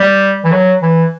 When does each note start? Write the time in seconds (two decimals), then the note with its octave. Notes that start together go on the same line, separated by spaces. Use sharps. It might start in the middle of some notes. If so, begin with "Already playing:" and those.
Already playing: G3
0.44 E3
0.52 F#3
0.83 E3